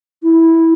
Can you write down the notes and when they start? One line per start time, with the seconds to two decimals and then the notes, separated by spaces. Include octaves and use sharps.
0.23 E4